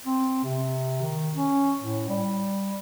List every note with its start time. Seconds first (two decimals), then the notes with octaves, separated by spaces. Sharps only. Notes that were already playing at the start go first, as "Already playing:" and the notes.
0.06 C4
0.44 C3
1.01 D#3
1.36 C#4
1.81 A2
2.09 G3